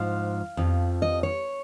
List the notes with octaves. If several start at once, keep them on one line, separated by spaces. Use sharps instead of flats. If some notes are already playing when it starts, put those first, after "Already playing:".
Already playing: G#2 F3 F5
F2 F3
D#5
C#5